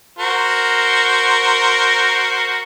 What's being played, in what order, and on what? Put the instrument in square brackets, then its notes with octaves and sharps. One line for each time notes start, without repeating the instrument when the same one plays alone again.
[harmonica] F#4 A#4 C5